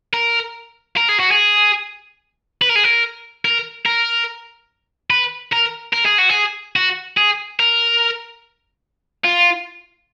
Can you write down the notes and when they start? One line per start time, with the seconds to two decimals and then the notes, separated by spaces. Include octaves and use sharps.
0.14 A#4
0.97 A#4
1.09 G#4
1.19 F#4
1.31 G#4
2.62 B4
2.69 A#4
2.76 G#4
2.84 A#4
3.45 A#4
3.86 A#4
5.10 B4
5.52 A#4
5.93 A#4
6.05 G#4
6.18 F#4
6.30 G#4
6.76 F#4
7.17 G#4
7.60 A#4
9.24 F4